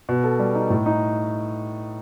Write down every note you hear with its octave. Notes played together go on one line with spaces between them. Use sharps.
B2
A4
G3
D#4
A2
D#4